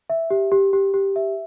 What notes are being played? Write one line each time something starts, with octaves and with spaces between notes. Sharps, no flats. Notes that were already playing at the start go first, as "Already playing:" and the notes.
E5
G4
G4
G4
G4
E5